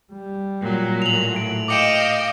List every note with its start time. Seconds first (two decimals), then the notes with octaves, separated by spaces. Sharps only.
0.13 G3
0.60 A#2 F#3
1.02 A2 F7 F#7
1.36 D7
1.68 D#5 F5 G5 D6 C#7 E7